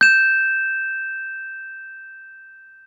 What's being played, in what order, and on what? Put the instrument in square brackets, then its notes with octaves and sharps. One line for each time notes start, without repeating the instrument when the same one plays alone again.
[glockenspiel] G6 E7